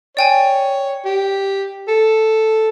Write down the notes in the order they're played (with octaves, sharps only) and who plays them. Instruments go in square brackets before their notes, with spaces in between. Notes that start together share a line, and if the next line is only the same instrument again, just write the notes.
[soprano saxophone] C#5 [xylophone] D5 G5 G#5
[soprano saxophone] G4
A4